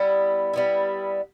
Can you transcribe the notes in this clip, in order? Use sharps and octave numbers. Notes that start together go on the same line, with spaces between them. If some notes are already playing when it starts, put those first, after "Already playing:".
Already playing: G3 B3 E4
G3 B3 E4